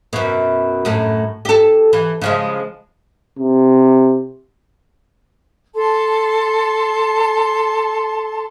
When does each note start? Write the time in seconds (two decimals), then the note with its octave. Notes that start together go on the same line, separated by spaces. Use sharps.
0.13 F#2 B2
0.85 F#2 A2
1.45 G4 A4
1.93 E3
2.21 C#3 F3 G#3
3.39 C3
5.75 A4 A5 C6